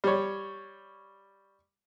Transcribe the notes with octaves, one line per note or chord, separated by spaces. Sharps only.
G3 C#5